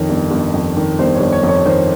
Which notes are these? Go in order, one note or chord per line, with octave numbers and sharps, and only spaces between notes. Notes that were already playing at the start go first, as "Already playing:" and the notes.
Already playing: F2 D#3 C#5
G1
G1
F2
D#3
G1 C5
C#5
G1
C#5
F2
C#5
D#3 C5